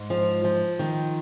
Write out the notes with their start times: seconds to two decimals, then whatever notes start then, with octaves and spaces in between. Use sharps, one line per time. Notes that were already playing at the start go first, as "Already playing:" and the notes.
Already playing: G#2
0.10 F3
0.44 F3
0.79 D#3